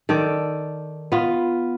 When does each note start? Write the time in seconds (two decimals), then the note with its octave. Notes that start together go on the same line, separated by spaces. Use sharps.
0.09 D#3 A4 D5
1.12 B3 F4